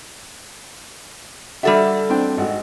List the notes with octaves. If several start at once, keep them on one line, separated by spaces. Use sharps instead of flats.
G3 D4 F#4 A4 E5
C4 D4 G5
G#1 F#4